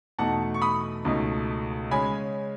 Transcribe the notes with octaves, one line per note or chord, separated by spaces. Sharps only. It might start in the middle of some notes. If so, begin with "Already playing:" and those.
E2 B2 A3 D#4 F#5 A5
C#6
B5 D#6
C#2 B2 A3 D#4
C#3 G#3 C#4 G#5 B5